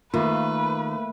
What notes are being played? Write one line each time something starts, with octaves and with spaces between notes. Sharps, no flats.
D#3 A3 A#3 F4 B4